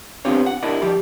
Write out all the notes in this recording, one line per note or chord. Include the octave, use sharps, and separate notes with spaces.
B3 C4 D4 F4 G4 C#5
F#5
D4 E4 G4 A#4 D5 D#5
F3 G4 D5